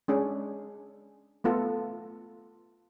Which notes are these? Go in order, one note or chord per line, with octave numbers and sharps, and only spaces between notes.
G#3 C#4 D4 G#4
A3 B3 F4 A4